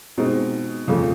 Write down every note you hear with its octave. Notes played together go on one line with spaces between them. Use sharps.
B2 G#3 C4 D#4
F2 C#3 F3 A3